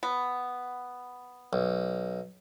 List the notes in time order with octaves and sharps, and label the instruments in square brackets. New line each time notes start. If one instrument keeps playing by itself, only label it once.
[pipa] B3
[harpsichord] B1